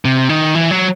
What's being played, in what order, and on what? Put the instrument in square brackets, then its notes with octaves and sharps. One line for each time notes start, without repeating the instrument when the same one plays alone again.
[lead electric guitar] C3
D#3
E3
F#3